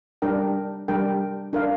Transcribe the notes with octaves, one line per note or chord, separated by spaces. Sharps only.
G3 D4 A#4 G5
G3 D4 A#4 G5
D4 A#4 F5